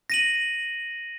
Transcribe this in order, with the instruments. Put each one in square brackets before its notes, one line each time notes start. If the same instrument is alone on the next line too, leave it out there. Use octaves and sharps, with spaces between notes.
[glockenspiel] A#6 D#7 F#7